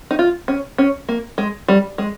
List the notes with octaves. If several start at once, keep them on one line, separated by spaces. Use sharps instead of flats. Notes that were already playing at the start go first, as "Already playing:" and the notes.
D#4
F4
C#4
C#4
A#3
G#3
G3
G#3